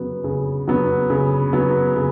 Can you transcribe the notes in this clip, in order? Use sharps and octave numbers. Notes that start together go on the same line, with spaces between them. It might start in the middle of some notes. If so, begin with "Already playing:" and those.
Already playing: C#3 F#3 B3
C#3
F#3 B3
C#3
F#3 B3
C#3